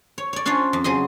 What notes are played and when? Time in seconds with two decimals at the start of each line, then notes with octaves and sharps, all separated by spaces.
0.18 C#5
0.33 C#5 D5
0.46 C#4 D4 F4 C5 C#5
0.73 F2
0.84 C#3 F#3 G#4 C5 D#5